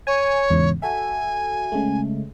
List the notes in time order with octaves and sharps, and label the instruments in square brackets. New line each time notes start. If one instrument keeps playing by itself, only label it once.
[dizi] C#5 [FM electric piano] G#5
[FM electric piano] E2 G#2 C#3
[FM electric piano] F#4 A4 E5 [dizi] G#5
[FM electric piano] C#3 G#3 A3